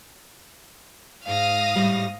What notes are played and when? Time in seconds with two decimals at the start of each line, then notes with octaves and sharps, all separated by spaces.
1.26 G#2 F5 D#6 A#6
1.76 A2 G3